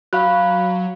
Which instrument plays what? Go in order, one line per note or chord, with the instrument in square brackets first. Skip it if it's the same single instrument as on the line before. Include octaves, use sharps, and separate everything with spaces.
[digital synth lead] F#3 [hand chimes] F5 B5 F#6